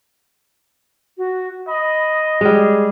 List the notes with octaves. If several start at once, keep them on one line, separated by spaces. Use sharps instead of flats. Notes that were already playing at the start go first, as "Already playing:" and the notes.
F#4
D#5 B5
G3 G#3 G#4